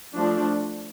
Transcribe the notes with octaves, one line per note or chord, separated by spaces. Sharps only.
F3 A3 D4